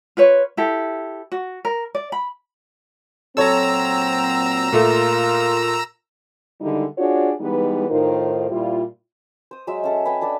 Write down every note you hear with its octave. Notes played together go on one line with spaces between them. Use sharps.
F4 B4 C#5
E4 G4 A4
F#4
A#4
D5
B5
A#2 F#3 C4 A4 C#5 A#5 E6
A#2 A3 F4 A#4
D3 D#3 G3 G#3 D#4 E4
D4 F4 F#4 G#4 C#5 D5
E3 G3 G#3 B3 D#4 B4
A2 D#3 D#4 F4 A#4 C5
A#2 G3 E4 F4
C5 D#6
F#3 G#3 E5 E6
C#4 A4
B4 D#5 G5 G#5
D4 A4 B4 D5